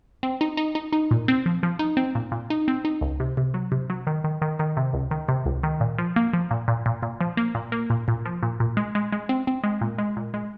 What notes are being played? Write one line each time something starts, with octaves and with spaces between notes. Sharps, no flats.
C4
D#4
D#4
D#4
D#4
A#2
C4
F3
F3
D#4
C4
A#2
A#2
D#4
C4
D#4
C#2
C3
C3
F#3
C3
F#3
D#3
D#3
D#3
D#3
C3
C#2
D#3
C3
C#2
D#3
A#2
F3
A#3
F3
A#2
A#2
A#2
A#2
F3
A#3
A#2
A#3
A#2
A#2
F3
A#2
A#2
G#3
G#3
G#3
C4
C4
G#3
A#2
G#3
A#2
G#3